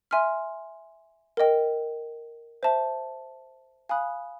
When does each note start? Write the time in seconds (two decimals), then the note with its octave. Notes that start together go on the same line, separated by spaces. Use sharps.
0.11 E5 G#5 C6 F6
1.37 A#4 D#5 G5
2.63 C5 E5 A5
3.89 F5 G#5 B5 D#6 F#6